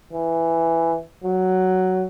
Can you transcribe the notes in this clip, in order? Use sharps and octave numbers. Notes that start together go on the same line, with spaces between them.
E3
F#3